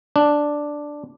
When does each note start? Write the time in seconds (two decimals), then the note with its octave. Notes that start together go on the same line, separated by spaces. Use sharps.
0.16 D4